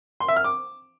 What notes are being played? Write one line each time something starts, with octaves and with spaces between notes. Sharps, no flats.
C6
E5
F6
D6